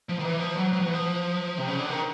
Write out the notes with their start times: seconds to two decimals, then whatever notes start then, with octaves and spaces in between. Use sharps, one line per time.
0.09 F3
0.19 D#3
0.24 E3
0.40 F3
0.57 F#3
0.73 F#3
0.79 F3
0.86 E3
0.93 F3
1.58 C3
1.68 C#3
1.79 D3
1.90 D#3